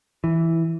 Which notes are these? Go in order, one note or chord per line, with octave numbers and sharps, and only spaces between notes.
E3